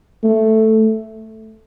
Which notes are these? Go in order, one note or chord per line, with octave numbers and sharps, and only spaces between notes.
A3